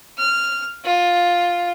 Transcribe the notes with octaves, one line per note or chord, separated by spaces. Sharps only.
F6
F4